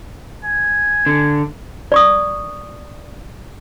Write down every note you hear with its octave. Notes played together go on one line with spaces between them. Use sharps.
G#5
D3
D5 C#6 D#6